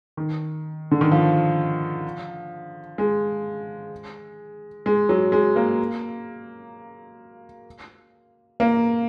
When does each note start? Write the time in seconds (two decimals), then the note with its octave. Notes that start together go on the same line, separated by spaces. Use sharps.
0.17 D#3
0.91 D3
1.01 D#3
1.12 F3
2.98 G#3
4.86 G#3
5.09 F#3
5.32 G#3
5.56 A#3
8.60 A#3